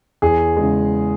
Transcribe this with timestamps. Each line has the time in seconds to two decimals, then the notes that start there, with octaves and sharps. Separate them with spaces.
0.22 E2 G#4
0.56 C#3 G#3